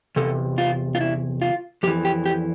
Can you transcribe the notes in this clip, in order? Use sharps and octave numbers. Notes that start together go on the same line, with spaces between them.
E2 C3 A4
F4
F4
E4
F4
F2 E3 G4
G4
G4